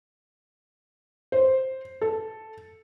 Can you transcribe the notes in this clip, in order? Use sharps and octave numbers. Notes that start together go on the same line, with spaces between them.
C5
A4